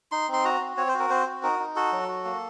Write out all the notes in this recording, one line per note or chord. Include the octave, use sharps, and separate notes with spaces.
D#4 C6
C4 C6
F#4 A#5
C4
C4 C#5
C5
F#4
A#4
C4 C5
F#4
D#4 A#4
D#4
F#4 A4
F#3
F#4
A#3